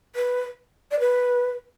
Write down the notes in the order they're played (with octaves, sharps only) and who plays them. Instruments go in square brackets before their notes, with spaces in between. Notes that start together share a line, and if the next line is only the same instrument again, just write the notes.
[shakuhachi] B4
D5
B4